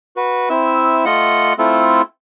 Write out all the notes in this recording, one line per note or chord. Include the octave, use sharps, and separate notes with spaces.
F#4 B4
C4 E4 E5 E6
A3 F4 D#5 F#5
A3 C4 E4 F4 A4